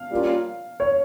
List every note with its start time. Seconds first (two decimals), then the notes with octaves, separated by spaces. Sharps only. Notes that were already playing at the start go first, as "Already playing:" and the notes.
Already playing: F5
0.11 G3 A#3 C#4 F4
0.80 C#5